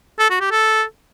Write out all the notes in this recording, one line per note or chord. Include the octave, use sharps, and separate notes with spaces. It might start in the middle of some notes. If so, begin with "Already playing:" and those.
A4
F#4
G4
A4